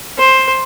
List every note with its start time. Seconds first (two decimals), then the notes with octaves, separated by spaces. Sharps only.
0.18 C5